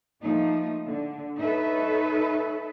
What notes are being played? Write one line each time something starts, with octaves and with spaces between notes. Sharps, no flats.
F3 A3 A#3 D#4
D3
D#4 A4 B4 C#5 E5